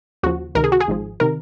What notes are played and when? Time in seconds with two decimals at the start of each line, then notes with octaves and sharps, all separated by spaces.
0.23 D#2 C#3 F3 F#4
0.55 C#2 C3 D#3 A#4
0.64 G#4
0.72 F#4
0.80 G#4
0.88 G#1 G#2 F3
1.20 C3 D#3 A#4